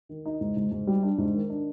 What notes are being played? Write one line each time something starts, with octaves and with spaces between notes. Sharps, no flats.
D#3
D#4
G#2
G#2
G#2
G3
D4
G#2
D#3
D4